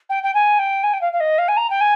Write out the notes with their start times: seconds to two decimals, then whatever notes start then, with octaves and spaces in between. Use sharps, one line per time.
0.09 G5
0.23 G5
0.34 G#5
0.59 G5
0.83 G#5
0.93 G5
1.01 F5
1.13 F5
1.20 D#5
1.38 F5
1.48 G#5
1.57 A#5
1.70 G5
1.81 G#5